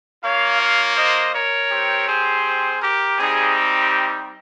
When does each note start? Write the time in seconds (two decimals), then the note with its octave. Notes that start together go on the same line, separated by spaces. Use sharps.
0.23 A#3 F4 C#5 F5
0.60 C#5 F5
0.97 C5 D#5
1.34 A#4 C#5
1.71 C4 G4
2.07 G#4 C5
2.81 G4 A#4
3.18 G3 C4 D#4 G4 G#4